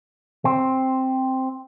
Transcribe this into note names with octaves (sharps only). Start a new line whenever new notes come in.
C4